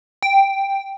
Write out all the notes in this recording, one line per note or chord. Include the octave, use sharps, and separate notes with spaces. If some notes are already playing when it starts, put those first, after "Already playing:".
G5